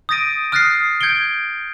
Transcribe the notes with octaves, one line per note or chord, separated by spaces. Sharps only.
D#6 G6 A6 A#6 D7 D#7
D#6 F6 F#6 A6 A#6 C7
G6 G#6 C#7 D7 G7